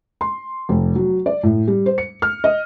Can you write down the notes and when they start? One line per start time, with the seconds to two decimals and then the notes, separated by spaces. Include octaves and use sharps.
0.21 C6
0.69 F1
0.96 F#3
1.26 D5
1.43 A2
1.68 G3
1.86 C5
1.98 C#7
2.22 F6
2.44 D#5